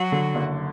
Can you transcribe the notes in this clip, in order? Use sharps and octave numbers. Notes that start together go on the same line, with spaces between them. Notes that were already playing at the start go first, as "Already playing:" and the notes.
Already playing: F#3 F#4
D3
F#1